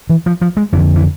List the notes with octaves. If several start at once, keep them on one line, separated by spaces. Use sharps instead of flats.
E3
F3
F3
G#3
F2 D3 E3
E3